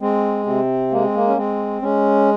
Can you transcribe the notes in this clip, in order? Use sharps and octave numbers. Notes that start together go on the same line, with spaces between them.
G#3 C4
C3 C4
G#3 A#3
C4
A#3
C#4
G#3 C4
G#3 C#4